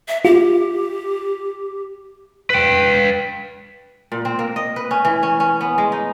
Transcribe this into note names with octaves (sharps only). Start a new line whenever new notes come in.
E5
F4 G4
B4 G5
A#2
C4
A#3
D#5
B4
C#4
E3
C#4
C#4
B3
G#3
D#4